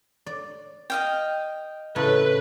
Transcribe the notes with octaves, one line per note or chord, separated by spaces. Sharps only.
D5
D#5 F5 G5
A2 C#3 A4 B4